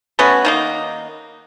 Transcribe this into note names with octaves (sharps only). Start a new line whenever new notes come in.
A3 B3 C#4 F#4
D#3 A#3 D#4